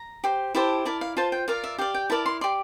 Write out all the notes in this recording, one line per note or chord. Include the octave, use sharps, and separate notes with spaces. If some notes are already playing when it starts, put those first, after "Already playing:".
Already playing: A#5
G4 C5
E4 G4 C5 A5
E4 A#4 D5 A5
F5
F4 C5 A5
G5
F4 A#4 D5 F5
E5
G4 D5 F5
G5
E4 A#4 D5 A5
C6
G4 D5 C6